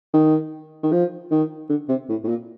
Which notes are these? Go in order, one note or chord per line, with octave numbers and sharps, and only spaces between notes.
D#3
D#3
F3
D#3
D3
C3
A2
A2
A#2